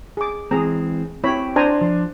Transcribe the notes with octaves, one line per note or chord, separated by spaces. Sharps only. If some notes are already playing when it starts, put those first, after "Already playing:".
G#4 D6
E3 G#3 C4 G#4 A#5
C4 E4 G4 C#5 B5
D4 C5 G#5 A#5
F3